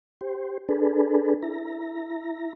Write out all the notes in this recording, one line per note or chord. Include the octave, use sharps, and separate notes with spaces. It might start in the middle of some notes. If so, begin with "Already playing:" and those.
G4 C5
D4 G#4 A4 B4
E4 A#5